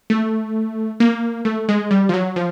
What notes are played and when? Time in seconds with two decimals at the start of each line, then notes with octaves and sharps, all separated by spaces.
0.10 A3
1.00 A#3
1.45 A3
1.69 G#3
1.91 G3
2.09 F3
2.14 F#3
2.36 F3